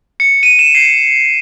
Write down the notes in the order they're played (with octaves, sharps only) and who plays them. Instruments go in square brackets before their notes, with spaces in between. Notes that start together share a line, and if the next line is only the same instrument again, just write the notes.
[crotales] C#7
D#7
E7
C7